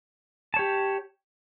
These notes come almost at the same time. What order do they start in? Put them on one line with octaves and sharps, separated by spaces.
A5 C#5 G4